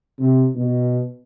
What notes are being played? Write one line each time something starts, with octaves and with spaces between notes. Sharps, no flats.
C3
B2